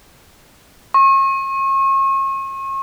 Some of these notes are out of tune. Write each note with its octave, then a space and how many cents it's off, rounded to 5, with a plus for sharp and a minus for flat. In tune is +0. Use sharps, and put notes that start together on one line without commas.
C#6 -40